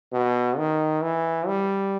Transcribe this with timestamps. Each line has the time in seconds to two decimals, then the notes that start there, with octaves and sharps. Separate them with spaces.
0.12 B2
0.57 D#3
1.02 E3
1.47 G3